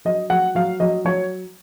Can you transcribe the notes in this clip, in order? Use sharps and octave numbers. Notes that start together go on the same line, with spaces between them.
F#3 D#5
F#3 F#5
F#3 F5
F#3 D#5
F#3 C#5